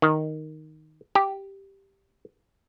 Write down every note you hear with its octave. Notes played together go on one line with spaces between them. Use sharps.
D#3
G4